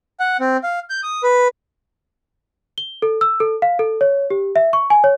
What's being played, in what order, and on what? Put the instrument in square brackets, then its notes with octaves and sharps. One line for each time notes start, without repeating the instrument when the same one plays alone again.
[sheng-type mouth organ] F#5
C4
F5
G6
D#6
B4
[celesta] G7
A4
E6
A4
F5
A4
C#5
G4
E5
C#6
G#5
C#5